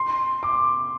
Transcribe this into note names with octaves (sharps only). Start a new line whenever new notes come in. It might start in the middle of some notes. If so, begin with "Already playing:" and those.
Already playing: C6
D6